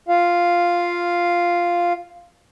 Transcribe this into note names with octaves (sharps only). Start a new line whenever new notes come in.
F4 F5